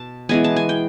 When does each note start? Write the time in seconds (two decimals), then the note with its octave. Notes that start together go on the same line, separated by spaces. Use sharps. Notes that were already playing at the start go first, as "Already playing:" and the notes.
Already playing: B2 A5
0.29 E3 G#3 B3 G#5
0.44 A5
0.56 G#5
0.69 G5